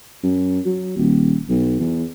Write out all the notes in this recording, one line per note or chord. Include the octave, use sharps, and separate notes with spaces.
F#2
F#3
D#1
B1
E2